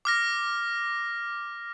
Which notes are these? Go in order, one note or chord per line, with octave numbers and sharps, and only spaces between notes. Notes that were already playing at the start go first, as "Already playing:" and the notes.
D6 F6 A#6